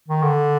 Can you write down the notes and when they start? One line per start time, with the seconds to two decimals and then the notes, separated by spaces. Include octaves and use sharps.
0.09 D#3
0.23 D3